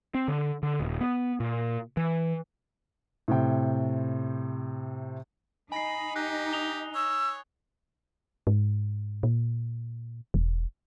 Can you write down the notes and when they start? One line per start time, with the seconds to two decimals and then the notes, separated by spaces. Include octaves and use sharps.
0.15 C4
0.28 D3
0.63 D3
0.80 D#1
1.01 B3
1.40 A#2
1.97 E3
3.28 A2 C3 G5
5.72 D#4 G#5 B5 A#6 C7
6.16 G4 F#6
6.52 D#6 F7 G7
6.95 C#5 E6
8.47 G#2
9.23 A#2
10.34 E1